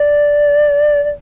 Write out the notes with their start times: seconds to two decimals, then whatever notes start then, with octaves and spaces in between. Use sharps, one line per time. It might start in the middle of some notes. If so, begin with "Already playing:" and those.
Already playing: D5
1.03 D5